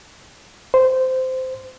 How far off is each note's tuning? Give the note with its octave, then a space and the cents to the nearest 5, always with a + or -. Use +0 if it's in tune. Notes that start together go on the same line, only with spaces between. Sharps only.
C5 -15